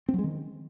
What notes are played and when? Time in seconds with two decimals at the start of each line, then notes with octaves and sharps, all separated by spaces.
0.09 C4
0.14 F#3
0.19 G#3
0.24 D#3